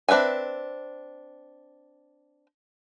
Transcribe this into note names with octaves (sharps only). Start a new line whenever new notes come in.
C4 D4 B4 E5 G#5